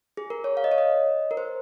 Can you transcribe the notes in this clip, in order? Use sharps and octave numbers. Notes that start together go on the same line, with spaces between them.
G#4
A#4
C#5
F5
D#5
C#5
D#5
A#4
C5